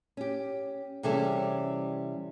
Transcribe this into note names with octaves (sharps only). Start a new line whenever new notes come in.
C#4 G4
C3 E3 G3 C#4 G#4 A4